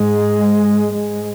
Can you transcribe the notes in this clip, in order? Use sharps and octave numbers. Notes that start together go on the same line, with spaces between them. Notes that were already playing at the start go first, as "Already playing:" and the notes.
Already playing: G#2 G#3
G#2 G#3